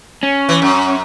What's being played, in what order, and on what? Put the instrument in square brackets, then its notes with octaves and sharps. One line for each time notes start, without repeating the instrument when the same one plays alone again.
[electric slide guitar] C#4
[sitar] E3
F#2